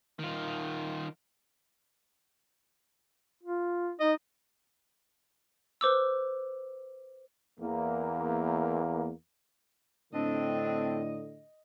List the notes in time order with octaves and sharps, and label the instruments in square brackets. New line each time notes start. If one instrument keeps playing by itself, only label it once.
[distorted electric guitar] D#3 F4
[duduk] F4
[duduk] D#4 [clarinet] D#5
[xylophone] B4 C5 D6 E6
[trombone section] E2 A#3
[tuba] A2 [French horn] D3 [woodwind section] C4 D4 [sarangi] D#5